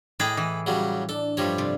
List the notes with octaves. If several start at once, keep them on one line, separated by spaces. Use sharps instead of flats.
A2 G#4 D#5 G5 B5 D6
E3
C#3 F#3 G3
D4 A4
G2 F3 G3 A3 C#5 F5
C3 D5 C6